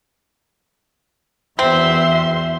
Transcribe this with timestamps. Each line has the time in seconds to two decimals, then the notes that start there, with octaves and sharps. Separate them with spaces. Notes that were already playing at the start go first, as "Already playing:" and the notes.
1.59 E2 C4 F#4 E5 C6